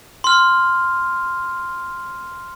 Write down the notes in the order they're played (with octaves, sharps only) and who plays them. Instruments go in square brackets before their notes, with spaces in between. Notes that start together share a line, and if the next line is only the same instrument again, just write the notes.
[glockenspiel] C6 F6